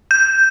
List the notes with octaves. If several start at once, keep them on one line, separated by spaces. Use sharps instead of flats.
G6